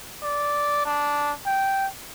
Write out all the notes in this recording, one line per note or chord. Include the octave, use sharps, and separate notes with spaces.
D5
D4
G5